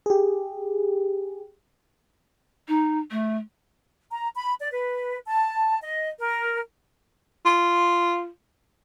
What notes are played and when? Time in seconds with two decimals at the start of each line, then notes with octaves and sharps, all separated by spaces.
0.06 G4 G#4
2.68 D#4
3.11 A3
4.11 A#5
4.36 B5
4.60 D5
4.71 B4
5.26 A5
5.81 D#5
6.19 A#4
7.46 F4